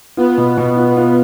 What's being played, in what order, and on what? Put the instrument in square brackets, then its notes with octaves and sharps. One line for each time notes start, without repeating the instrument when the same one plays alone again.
[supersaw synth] B3 [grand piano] F4
[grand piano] B2
B2
F4
F4